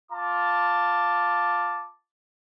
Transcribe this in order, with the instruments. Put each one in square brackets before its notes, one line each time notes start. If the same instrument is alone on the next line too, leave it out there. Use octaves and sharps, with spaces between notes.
[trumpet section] F4 A5 D6